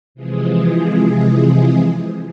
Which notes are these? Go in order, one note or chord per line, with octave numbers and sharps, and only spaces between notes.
C3 E3 F3 G#3 G#4